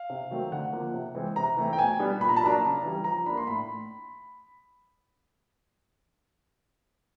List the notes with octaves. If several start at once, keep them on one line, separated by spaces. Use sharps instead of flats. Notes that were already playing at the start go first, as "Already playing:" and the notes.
Already playing: F5
C3
D#3 F#3 A3 C4
D3 F#5
F3 A#3
C3
E3 G#3 C4
C3 A#5
E3 A3 C4
G5
B2 G#5
G3 B3 D4
A#2 B5
A#5
A5
F#3 A#3 D4 A#5
C#3
E3 G3
F3 A#5
A#3 D4 B5
C6
A2 B5